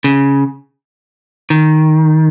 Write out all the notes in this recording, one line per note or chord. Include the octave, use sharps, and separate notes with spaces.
C#3
D#3